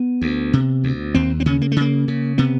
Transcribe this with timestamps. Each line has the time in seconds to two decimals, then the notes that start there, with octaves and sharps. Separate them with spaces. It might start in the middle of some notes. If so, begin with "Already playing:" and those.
Already playing: B3
0.21 D2
0.53 C3
0.84 D2
1.15 D#2 C4
1.40 C4
1.46 C#3 C#4
1.62 A#3
1.72 A3
1.76 C#3 A#3
2.08 C#3
2.38 C3 B3